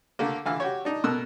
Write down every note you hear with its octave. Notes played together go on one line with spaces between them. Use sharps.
D3 A3 A#3
D3 E3 F5
F#4 G4 C#5
D4 D#4
B2 A4 A#4 E6 F#6